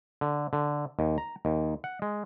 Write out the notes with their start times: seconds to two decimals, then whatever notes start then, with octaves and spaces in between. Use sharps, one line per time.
0.21 D3
0.53 D3
0.99 D#2
1.18 A#5
1.45 D#2
1.84 F#5
2.02 G#3